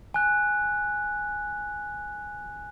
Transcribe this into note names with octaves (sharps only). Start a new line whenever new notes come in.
G#5 F#6